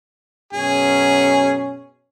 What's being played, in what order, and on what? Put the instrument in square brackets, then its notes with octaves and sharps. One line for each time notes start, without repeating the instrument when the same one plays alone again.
[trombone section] F#2 B2 C#4 [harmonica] G#4